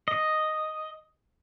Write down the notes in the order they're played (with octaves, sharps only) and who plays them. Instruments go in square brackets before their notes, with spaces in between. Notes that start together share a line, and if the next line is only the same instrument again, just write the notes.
[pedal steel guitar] D#5